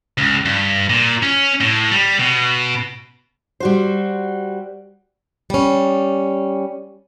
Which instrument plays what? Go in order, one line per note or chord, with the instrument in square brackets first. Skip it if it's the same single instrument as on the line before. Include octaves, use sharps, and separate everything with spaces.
[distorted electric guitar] C#2
G2
A#2
C#4
A2
G3
B2
[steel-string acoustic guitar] G3 F#4 C5
G3 C#4